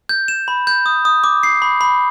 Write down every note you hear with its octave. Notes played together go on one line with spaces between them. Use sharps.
G6
E7
B5
G6
D#6
D#6
D6
C7
B5
B5